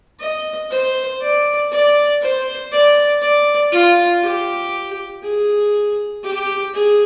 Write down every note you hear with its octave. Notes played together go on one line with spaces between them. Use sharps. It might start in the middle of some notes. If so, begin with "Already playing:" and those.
D#5
C5
D5
D5
C5
D5
D5
F4
G4
G#4
G4
G#4